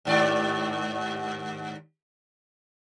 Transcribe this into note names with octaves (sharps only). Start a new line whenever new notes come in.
D#2 G#2 D5